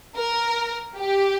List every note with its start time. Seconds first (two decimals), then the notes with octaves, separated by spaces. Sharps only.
0.15 A#4
0.96 G4